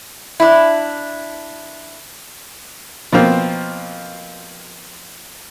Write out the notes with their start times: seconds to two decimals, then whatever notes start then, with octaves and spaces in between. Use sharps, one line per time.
0.40 D4 E4
3.13 B2 F3 A#3 C4